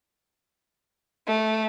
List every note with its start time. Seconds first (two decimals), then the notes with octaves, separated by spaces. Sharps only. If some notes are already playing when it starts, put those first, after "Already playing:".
1.27 A3